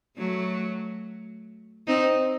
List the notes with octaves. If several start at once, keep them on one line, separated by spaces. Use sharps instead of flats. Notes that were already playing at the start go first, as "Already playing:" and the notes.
F#3 A3
C4 D#4